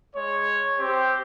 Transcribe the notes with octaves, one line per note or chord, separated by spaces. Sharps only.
G#3 C#5
C4 G4 C5